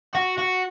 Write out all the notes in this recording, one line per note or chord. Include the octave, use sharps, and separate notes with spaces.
F#4
F#4